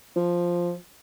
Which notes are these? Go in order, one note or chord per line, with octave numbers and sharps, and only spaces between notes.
F3